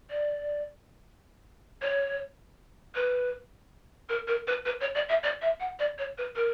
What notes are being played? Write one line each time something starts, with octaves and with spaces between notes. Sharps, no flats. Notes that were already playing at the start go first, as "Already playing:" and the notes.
D5
C#5
B4
A#4
A#4
B4
B4
C#5
D5
E5
D5
E5
F#5
D5
C#5
B4
A#4